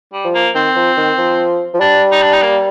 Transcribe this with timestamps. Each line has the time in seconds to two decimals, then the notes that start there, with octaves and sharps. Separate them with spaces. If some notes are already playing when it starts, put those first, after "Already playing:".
0.13 G3
0.24 F3
0.34 A#3
0.55 D#3 C4
0.76 F3
0.97 D#3
1.18 F3
1.74 F3
1.80 G3 D4
2.12 D#4
2.22 D4
2.33 D#4
2.42 A#3